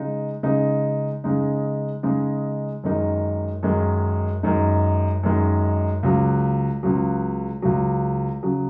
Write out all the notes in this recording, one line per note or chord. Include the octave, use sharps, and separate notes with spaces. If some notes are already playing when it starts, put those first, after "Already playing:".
Already playing: C#3 G#3 D#4
C#3 G#3 D#4
C#3 G#3 D#4
C#3 G#3 D#4
F#2 D#3 G#3 D#4
F#2 D#3 G#3 D#4
F#2 D#3 G#3 D#4
F#2 D#3 G#3 D#4
C#2 C#3 F#3
C#2 C#3 F#3
C#2 C#3 F#3
C#3 F#3